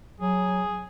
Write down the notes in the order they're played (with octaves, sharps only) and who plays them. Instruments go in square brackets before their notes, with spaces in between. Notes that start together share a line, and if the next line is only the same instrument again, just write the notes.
[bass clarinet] F#3 [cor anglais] G#4